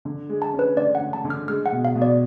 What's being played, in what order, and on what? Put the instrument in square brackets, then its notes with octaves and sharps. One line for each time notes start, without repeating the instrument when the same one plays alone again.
[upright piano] D3
G#3
[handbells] A5
[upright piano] C#4
[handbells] B4
[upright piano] D3 [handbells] D5
[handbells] F#5
[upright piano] D3
[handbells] A5
[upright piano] D3
[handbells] F6
[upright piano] G#3 [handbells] F6
[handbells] F#5
[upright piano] B2
[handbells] F5
[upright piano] B2
[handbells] D5